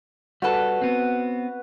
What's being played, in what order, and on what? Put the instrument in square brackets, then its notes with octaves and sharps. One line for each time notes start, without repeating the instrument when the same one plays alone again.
[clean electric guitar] G3 A4 [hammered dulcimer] F#4 B4
[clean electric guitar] B3 C4